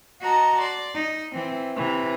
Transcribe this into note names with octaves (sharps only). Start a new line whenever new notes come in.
F#4 D#5 A5 A#5
D5 C6
D#4
E3 C4
C3 E3